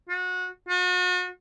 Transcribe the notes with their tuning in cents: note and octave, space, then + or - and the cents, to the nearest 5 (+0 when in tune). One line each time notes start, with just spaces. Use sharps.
F#4 -25
F#4 -40